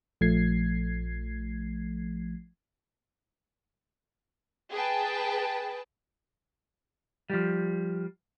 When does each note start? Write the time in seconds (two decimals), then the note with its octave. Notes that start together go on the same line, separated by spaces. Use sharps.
0.21 A#1 F3 A3 G#6 C7
4.72 G#4 B4 G5 A5
7.30 F3 G3